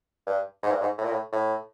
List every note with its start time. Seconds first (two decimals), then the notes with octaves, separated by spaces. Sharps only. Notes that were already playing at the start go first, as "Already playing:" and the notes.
0.27 G2
0.63 G#2
0.71 G2
0.82 G#2
0.98 A2
1.04 A#2
1.12 A2
1.33 A2